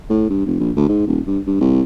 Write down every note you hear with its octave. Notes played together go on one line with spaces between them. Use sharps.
A2
G2
F1
A#1
D2
G#2
D#1
G2
G2
C2